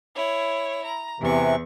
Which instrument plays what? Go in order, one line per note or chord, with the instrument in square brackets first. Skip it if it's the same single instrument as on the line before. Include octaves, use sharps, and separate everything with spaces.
[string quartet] E4 C#5
A#5
[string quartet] E2 C#6 [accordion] C3 E3